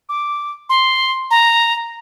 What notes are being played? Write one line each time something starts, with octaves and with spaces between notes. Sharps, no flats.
D6
C6
A#5